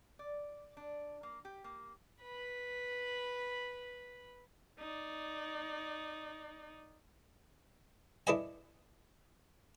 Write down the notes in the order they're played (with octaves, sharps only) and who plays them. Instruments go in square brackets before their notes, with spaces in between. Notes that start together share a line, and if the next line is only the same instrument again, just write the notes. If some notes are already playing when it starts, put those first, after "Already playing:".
[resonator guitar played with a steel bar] D5
D4
A#3
G4
A#3
[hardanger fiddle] B4 B5
[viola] D#4 D5
[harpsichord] D4 E4 A4 B4 D#5 G#5